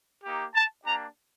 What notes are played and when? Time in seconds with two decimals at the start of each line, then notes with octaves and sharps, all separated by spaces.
0.23 A#3 D#4 G4
0.54 A5
0.84 A#3 D4 G4 A#5